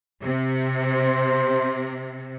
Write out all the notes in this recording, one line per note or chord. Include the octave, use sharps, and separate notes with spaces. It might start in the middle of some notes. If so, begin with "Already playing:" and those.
C3
C5